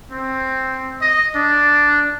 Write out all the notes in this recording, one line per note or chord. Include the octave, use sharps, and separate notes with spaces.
C4
D#5
D4